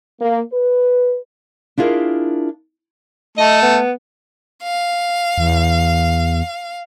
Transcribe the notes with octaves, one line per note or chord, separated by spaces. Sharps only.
A#3
B4
D4 E4 F4 G#4 A#4
A3 D#5
B3
F5
E2